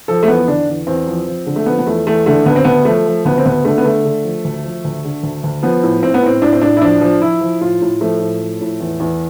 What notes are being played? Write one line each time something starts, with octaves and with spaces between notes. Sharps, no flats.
F3 A4
A3
E2 B3
D3 D4
E2
E2 C4
F3
F3
D3
A3
F3 B3
B3
E2 A3
E2 A3
D3 A3
D2 B3
C4
D2 B3
F3 A3
F3
D2 B3
C4
D2 B3
D3 A3
B3
D3 A3
D3
F3
D2
F3
D2
D3
D2
D2
F3 B3
A2
A2 C4
B3
A2 C4
A2 D4
C4
A2 D4
E4
F3 D4
F3
F3 E4
F3
A2 F4
A2
F3 A3
A2
F3
A2
E2
E2